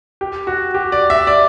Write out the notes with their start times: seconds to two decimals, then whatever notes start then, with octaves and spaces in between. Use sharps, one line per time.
0.21 G4
0.47 F#4
0.74 G4
0.92 D5
1.10 E5
1.27 D5